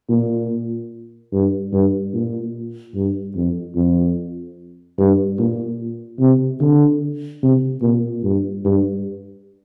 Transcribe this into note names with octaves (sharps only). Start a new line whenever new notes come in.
A#2
G2
G2
A#2
G2
F2
F2
G2
A#2
C3
D3
C3
A#2
G2
G2